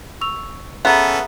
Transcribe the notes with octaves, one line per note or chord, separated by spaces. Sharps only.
C#6 E6 F7
B3 C#4 G#4 A4 B4 E5 A#5